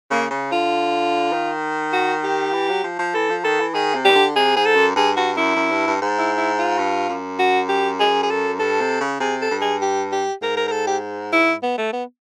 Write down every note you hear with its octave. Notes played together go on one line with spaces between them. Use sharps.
C#3 A#3
C#3
D3 F4
D#3
F#4
G4
E3
F#3
F3
F3
E3 A4
F3
D#3 A4
E3
D#3 G#4
C3
G4
D#3
D3
C3 G#4
G#2 G#4
A4
F#2
G2 G#4
G2 F#4
F#2 E4
F#2
G2
G2
G#2
E4
E4
F4
G2
F#2
F#4
G4
G#4
G#4
A4
G2 A4
C3
C#3
C3 G#4
A4
G2
G#4
G4
G4
G#2 A#4
A#4
A#4
A4
G4
E4
B3
A3
B3